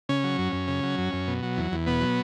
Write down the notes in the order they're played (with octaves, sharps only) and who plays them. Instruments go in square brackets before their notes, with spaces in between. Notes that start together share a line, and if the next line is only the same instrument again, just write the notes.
[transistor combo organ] C#3 C#4
F#3
F#2
F#2
C#3
F#3
F#2
F#2
B2
F#3
E2
E2
B2 B3
F#3